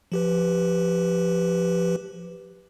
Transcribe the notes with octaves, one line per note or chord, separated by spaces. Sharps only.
F3 G4 B4